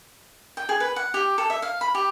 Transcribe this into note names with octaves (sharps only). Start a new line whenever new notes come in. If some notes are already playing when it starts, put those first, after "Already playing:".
G5
G#4
B4
F#5
G4
A4
E5
F5
B5
G4